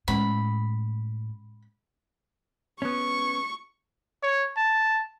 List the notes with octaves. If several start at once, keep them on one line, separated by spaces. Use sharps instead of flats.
A2 G#3 C#4 B5
B3 C#4 C#6
C#5
A5